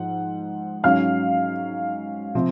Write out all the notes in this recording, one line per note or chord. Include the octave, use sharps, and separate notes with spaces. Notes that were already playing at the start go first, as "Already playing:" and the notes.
Already playing: G#2 F3 F#5
G#2 F#3 C#4 F5 F6
C3 F3 C4